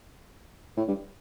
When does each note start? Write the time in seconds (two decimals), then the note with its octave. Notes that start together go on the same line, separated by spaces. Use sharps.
0.77 A2
0.88 G2